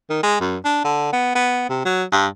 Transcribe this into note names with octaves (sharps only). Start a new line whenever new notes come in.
D#3
G#3
F#2
D4
D3
B3
B3
C3
F#3
G2